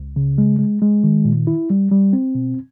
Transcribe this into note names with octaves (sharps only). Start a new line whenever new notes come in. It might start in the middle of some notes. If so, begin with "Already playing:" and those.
Already playing: C#2
C#3
G#3
G#3
G#3
D#3
A#2
E4
G3
G3
C4
B2